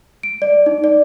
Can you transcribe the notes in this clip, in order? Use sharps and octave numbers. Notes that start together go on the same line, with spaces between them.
D7
D5
D#4
D5